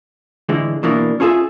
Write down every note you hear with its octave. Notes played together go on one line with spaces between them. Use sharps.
A2 D3 E3 G#3
B2 E3 A#3 D4
C#4 F4 G#4 A4 E5